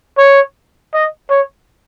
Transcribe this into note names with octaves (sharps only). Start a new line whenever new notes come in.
C#5
D#5
C#5